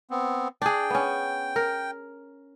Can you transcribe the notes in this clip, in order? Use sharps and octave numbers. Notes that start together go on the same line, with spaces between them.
B3 C4
D4 G#4 G5
B3 C#4
A#4